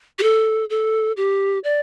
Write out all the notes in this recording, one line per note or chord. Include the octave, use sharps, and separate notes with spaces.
G4
A4
A4
G4
D5